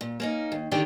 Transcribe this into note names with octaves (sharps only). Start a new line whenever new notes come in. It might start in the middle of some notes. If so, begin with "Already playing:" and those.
A#2
A#3 C#4 D#4
D#2
D3 D#3 D4 G4 A4